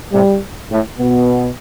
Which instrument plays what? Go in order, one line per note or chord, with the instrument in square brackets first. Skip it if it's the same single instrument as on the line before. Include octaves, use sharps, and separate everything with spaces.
[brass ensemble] A2 C3 [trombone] G3
[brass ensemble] A2
[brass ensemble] B2 [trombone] B3